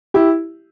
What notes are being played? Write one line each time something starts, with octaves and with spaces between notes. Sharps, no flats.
E4 G4